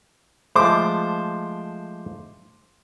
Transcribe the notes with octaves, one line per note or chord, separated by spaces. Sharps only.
F3 G#3 A3 C5 D6